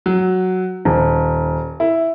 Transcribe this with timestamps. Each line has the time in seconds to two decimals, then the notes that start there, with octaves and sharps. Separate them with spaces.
0.06 F#3
0.85 D#1
1.80 E4